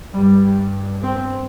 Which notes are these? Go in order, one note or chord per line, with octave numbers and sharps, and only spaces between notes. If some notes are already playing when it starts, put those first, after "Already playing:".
G2 G3
G3
C4